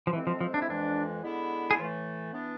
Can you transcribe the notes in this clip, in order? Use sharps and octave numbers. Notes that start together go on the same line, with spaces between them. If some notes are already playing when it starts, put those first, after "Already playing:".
F3
F2 C3 E3 G#3 C4
F3
F3
D4
E4
F2 E3 G#3 D4
D3 G#3 B3 E4
G#4
A2 E3 A3 F4
E3 B3 D4